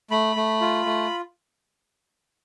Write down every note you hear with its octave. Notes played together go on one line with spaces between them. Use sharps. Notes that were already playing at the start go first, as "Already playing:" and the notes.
A3 B5
A3
F4
A3